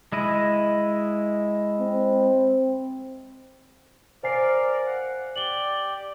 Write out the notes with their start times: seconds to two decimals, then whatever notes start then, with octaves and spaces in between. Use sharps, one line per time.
0.12 G#3 E4 D#5
1.80 C4
4.23 A#4 C5 D5 F5 G#5 C7
4.86 F#5
5.36 G4 D5 F#7 G7